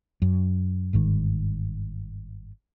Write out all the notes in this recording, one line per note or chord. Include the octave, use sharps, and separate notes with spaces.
F#2
G1 G#2 D#3